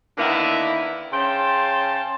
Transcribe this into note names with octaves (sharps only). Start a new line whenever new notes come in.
D3 D#3 A#3 B3 E4
C#3 C#4 C5 G5 A5 C6